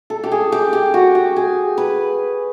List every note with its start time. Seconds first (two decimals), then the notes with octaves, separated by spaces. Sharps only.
0.10 A4
0.24 G4
0.32 G#4
0.52 G4
0.73 G4
0.94 F#4
1.15 G4
1.36 G#4
1.78 B4